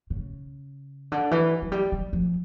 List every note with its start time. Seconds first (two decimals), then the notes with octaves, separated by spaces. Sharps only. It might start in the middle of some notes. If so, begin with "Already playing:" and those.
0.10 C#3
1.12 D3
1.31 E3
1.62 F#3
1.72 G3
1.92 G3
2.13 F3